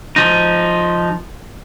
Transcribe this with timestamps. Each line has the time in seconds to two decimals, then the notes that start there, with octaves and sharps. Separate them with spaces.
0.16 F3 D#4